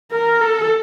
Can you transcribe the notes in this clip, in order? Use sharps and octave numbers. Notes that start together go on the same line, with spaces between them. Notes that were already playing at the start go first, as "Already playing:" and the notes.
A#4
A4